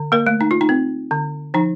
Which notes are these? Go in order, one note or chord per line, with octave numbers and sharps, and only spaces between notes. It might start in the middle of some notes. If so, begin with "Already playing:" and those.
Already playing: D3
A#3 A#4
A3
D#4
F4
D#4
C4
D3
F3 D#4